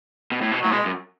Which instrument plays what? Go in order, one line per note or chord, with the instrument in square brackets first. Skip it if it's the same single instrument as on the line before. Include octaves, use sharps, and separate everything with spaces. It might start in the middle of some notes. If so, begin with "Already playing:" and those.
[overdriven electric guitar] B2
A2
B2
[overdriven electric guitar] A2 [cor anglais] F#3
[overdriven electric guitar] B2 [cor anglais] G#3
[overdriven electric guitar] F#2